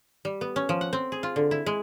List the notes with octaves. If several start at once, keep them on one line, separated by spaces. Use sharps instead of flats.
G3
B3
C#4
F3
F#5
C4
G#4
F4
D3
E4
G#3